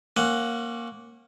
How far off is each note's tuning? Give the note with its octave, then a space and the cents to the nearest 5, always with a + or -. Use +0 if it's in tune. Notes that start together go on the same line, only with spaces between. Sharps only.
A#3 +0 C#4 -30 F#5 +0